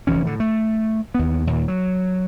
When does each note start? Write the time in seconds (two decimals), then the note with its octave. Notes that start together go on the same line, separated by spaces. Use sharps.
0.07 F1 D2 E3 C#4
0.25 A2 D3
0.40 A3
1.14 D#2 B3
1.47 D#2 A#2
1.68 F#3